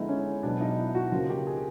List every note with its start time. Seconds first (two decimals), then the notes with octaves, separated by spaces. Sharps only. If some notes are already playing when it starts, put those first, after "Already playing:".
Already playing: D3 F3 G#3 B3 D#4 E4
0.09 C#4
0.43 B2 F#3 B3 D4
0.61 D#4
0.78 E4
0.95 F#4
1.12 C#3 F3 A#3 F4
1.30 G4
1.47 G#4